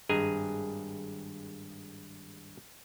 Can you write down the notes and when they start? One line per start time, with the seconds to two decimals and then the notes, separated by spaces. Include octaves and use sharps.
0.09 G#1 G2 G#4 D#5 G#5 A#5